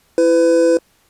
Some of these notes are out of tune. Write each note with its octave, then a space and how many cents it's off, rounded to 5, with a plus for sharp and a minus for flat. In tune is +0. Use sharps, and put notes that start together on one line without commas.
E4 +20 B4 +30